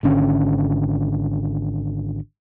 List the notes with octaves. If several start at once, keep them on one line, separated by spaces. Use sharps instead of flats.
G#1 D3 C#4